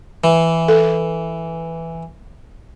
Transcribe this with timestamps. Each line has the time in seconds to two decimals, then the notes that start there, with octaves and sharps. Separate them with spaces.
0.24 E3
0.68 A4